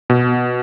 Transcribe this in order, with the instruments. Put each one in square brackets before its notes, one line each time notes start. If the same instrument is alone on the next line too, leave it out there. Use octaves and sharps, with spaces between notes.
[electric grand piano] B2